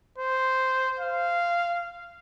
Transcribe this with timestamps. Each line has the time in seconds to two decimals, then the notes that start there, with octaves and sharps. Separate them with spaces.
0.18 C5
0.99 F5